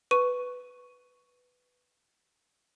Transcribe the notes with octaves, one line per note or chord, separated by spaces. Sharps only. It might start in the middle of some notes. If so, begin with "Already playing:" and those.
B4 C#6 D#7